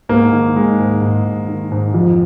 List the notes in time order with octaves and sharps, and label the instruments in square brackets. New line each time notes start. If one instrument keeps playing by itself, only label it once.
[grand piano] G#2 A#3
D#3
D#3 G#3
G#2
G#2
D#3
D#3
G#2
F2 F3